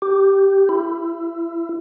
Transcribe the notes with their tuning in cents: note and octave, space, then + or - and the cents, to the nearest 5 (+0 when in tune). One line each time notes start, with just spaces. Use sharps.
G4 -5
E4 +30